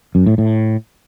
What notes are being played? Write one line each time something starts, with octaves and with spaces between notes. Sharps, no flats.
F#2
A2
A2